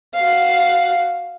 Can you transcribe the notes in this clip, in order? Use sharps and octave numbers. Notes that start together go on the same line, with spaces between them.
F#4 F5